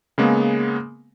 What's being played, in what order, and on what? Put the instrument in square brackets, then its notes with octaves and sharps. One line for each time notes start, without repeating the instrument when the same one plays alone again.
[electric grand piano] C#3 G#3 A#3 B3